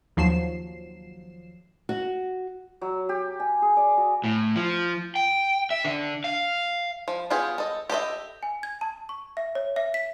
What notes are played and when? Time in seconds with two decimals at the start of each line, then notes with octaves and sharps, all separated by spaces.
0.17 D#2 F3 F#3 C7 E7
1.89 F#4
2.81 F#3
3.09 G4
3.40 G#5
3.62 G#4
3.77 D5
3.97 F#4
4.24 A2
4.56 F3
5.16 G5
5.70 E5
5.84 D3
6.24 F5
7.08 F3
7.30 B3 F4 G4 G#4
7.58 A4 D#5
7.90 G4 A4 D#5 E5
8.43 G#5
8.63 G#6
8.81 A5
9.09 C#6
9.37 E5
9.55 C#5
9.76 E5
9.94 B6